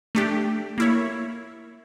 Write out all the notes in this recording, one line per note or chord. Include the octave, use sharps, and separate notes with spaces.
A3 D4 G4
A#3 E4 C#5